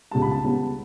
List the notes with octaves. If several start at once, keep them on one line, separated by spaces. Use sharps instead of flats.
C#2 C#3 G3 B3 A5
B5
A5
C#2 C#3 G3 B3